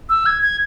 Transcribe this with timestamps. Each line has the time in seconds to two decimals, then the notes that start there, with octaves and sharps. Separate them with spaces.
0.09 E6
0.26 G#6
0.42 G#6